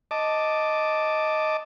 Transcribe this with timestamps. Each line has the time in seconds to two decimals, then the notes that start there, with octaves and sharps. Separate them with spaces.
0.11 D#5 A5 D6